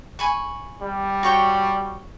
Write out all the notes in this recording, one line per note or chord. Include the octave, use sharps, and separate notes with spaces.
G#5 B5 C#6
G3
F#4 C#5 G5